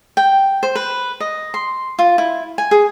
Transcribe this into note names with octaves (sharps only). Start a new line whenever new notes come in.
G5
C5
B4
D#5
C6
F4
E4
G#5
G#4